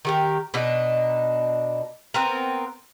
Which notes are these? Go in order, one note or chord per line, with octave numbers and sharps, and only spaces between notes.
D#3 G4 A#4
B2 D4 D#4
B3 C4 A#4